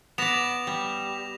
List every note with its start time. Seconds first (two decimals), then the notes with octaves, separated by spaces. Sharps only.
0.18 B3 D5 A#6 E7 F7
0.67 G3